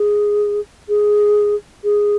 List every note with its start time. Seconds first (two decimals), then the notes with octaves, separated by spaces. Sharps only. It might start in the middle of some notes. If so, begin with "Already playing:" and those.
Already playing: G#4
0.88 G#4
1.84 G#4